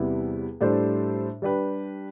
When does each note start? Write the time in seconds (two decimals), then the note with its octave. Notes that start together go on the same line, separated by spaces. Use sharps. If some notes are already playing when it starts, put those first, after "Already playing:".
Already playing: E2 C3 G3 B3 E4
0.61 A2 G3 D4 A4 C5
1.42 G3 D4 G4 B4